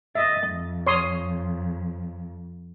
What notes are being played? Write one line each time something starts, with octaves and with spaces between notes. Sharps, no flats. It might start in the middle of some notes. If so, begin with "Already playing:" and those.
D#5 E5 A6
F2
C#5 C6 D#6